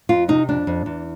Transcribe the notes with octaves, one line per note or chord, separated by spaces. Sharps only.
F2 F4
C3 D#4
F2 D4
F2
E2